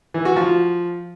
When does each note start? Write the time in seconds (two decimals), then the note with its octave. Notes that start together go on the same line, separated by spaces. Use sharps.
0.14 E3
0.25 F#4
0.36 F3